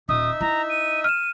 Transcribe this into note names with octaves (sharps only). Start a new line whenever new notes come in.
D#1 D#4 E5 D#6
E4 A#5
D#7
F6 D#7 E7